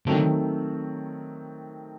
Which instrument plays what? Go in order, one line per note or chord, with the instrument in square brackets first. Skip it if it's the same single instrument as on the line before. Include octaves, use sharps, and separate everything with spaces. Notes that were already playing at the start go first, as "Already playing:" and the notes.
[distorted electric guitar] D3 [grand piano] D#3 F#3 A3 C4